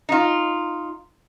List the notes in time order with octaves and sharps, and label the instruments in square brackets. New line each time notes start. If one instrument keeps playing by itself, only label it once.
[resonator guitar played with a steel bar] D#4 F4